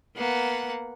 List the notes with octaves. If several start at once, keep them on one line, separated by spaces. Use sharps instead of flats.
A#3 B3 F#5